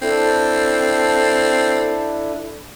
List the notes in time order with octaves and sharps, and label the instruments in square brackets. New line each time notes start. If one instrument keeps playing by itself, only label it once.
[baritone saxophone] C4 [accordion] D4 E4 [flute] A4